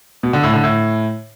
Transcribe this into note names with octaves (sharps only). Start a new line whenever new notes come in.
B2
D3
A2
D3
A2